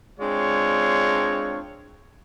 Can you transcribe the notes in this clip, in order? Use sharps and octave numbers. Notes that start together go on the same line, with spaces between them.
G#3 C4 D4 F4 C#5